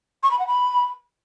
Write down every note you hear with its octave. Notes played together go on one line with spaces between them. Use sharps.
C#6
B5
F#5
B5